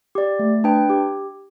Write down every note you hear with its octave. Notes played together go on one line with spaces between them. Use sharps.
G4 D5
A3
D4 B4 G5
G4